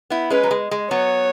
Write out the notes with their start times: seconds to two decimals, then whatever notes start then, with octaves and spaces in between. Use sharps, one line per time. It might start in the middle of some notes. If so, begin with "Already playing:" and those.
0.10 B3 E4
0.30 G#3 C#4 B4
0.43 F#3
0.51 G#3
0.71 G#3
0.90 F#3 B3 C#5